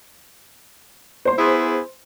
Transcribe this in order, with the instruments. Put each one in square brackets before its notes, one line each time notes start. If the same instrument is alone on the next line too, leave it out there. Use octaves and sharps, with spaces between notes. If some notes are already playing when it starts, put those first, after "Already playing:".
[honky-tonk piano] C5 C6
[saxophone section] B3 E4 G#4